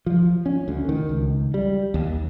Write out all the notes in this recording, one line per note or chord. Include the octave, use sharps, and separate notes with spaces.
F3
C#4
D2
D#3
C#2
G3
D#2